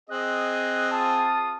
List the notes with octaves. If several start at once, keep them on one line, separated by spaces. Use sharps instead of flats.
C4 G#4 D#5 F#6
F4 F5 A5 D#6